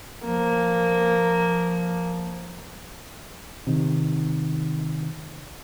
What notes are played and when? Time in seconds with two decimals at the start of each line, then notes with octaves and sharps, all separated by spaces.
0.25 F3 A#3
3.67 C3 D#3